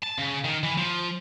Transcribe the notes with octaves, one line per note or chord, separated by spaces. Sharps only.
A5
C#3
D#3
E3
F3